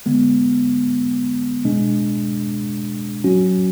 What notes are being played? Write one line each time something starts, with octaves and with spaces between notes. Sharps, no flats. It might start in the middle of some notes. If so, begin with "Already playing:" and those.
D3 G#3 B3
B2 G#3 D4
F#3 C#4 F#4